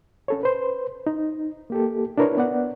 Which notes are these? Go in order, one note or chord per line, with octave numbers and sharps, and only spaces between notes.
C#4 A4 C#5
B4 C5
D#4
A#3 G4 A4
D4 E4 A#4 B4 C#5
B3 D5 F#5